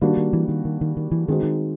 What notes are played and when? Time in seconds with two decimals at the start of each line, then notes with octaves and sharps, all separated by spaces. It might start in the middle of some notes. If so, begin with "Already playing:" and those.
0.01 D#3 G3 A#3 D4 F#4
0.17 D#3
0.33 E3
0.48 D#3
0.65 D#3
0.81 D#3
0.97 D#3
1.12 E3
1.28 D#3 G#3 C4 D#4 F#4
1.43 D#3